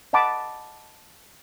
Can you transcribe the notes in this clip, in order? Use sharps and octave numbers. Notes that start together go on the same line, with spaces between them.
D#5 F#5 A5 B5 D6